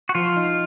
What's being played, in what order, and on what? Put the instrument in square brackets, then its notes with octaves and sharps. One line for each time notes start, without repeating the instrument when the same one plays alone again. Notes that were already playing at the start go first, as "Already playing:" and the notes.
[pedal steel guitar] F#4
[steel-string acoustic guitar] F3 [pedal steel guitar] F4
[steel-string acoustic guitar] D#4